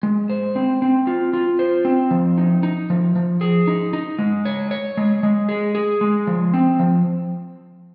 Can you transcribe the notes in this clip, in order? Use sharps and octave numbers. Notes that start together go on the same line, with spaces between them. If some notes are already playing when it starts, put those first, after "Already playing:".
G#3
C5
C4
C4
F4
F4
C5
C4
F3
D#4
D#4
F3
F3
G#4
D#4
D#4
G#3
C#5
C#5
G#3
G#3
G#4
G#4
G#3
F3
C4
F3